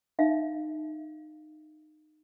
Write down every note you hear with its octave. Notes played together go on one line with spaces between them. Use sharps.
D#4 E5 F5